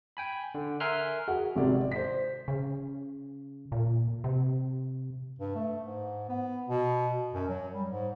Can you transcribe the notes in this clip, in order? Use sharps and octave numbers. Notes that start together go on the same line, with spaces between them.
G5 G#5 B5
D3
A#4 E5 G#5 C6 F6 F#6
F#4 G#4 F#5
G#1 C3 D5
C5 B6
C#3
A#2
C3
G2
A3
G#2
B3
B2
F#2
F#3
G3
G#2